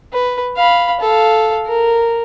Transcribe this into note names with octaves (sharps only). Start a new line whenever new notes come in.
B4
F5 B5
A4 F5
A#4